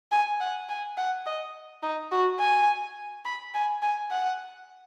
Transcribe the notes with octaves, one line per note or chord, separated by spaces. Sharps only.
G#5
F#5
G#5
F#5
D#5
D#4
F#4
G#5
B5
G#5
G#5
F#5